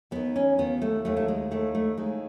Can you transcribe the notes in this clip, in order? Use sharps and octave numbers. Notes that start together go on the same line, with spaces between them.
D#2 D#3 B3
C#4
D#2 D#3 B3
A3
D#2 D#3 A3
A3
G#3
D#2 D#3 A3
A3
D#2 D#3 G#3